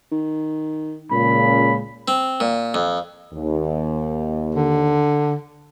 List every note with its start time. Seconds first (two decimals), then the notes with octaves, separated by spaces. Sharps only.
0.12 D#3
1.11 C#2 A#2 C#3 B5
2.08 C4
2.40 A#2
2.74 F2
3.33 D#2
4.55 D3